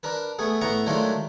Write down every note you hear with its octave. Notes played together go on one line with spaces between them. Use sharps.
D4 A#4 B4
A3 B3 G#4
A2 B3 F#5 A#5 C#6
D#3 F#3 G#3 A3 D4 F4